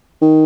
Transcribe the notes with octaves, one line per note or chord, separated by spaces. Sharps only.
D#3